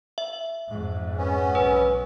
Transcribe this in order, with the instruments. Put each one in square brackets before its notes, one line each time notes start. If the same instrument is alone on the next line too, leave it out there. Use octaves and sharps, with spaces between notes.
[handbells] E5
[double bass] F2 G#2
[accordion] B3 C#4
[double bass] B1 [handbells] B4